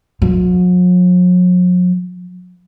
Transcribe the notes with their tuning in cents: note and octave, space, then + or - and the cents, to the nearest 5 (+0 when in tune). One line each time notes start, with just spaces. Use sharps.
F#3 -45